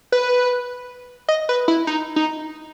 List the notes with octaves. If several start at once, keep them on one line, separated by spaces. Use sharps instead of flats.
B4
D#5
B4
E4
D#4
D#4